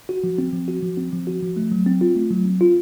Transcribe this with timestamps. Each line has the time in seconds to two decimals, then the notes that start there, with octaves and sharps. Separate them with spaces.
0.09 F#4
0.24 F3
0.38 C4
0.53 F3
0.68 F#4
0.83 F3
0.97 C4
1.12 F3
1.27 F#4
1.42 F3
1.57 A3
1.72 F#3
1.86 C4
2.01 F4
2.16 A3
2.31 F#3
2.45 C4
2.61 F4